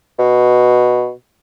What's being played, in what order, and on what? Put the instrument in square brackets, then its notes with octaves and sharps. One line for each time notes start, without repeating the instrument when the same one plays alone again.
[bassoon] B2